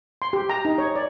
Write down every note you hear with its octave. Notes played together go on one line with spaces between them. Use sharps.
C6
G4
A#5
D#4
C#5
D5